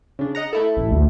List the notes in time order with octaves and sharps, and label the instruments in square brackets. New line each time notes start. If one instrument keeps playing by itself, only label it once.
[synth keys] C#3 D4
D#5 F#5 A#5
A3 E4 A4
[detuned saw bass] A1
D2